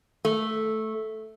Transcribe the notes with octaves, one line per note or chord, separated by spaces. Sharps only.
A3